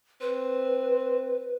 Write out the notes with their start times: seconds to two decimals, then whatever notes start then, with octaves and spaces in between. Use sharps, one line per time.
0.21 C4 B4